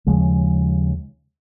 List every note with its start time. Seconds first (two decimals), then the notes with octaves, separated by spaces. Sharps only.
0.07 D#2 C#3 F3 G#3